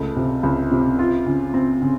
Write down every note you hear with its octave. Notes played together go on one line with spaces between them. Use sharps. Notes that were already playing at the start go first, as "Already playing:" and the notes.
Already playing: C#2 A3
C3
C#2
C3
F4
C#3
C4
C#3